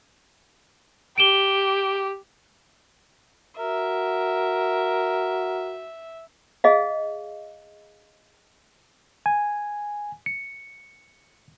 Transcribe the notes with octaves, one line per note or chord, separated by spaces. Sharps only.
G4 D7 E7 G7
F#4 A#4 E5
G#4 D#5 F5
G#5
C#7